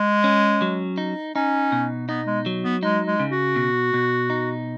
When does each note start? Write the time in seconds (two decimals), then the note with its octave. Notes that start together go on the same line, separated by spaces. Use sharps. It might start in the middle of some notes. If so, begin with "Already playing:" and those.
Already playing: G#3
0.24 C#4
0.62 F#3
0.98 D#4
1.35 C#4 D#4
1.72 B2
2.09 B3 D#4
2.27 G#3
2.46 F#3
2.63 B3
2.83 G#3 D#4
3.07 G#3
3.19 C#3
3.32 F#4
3.56 B2
3.94 B2
4.30 D#4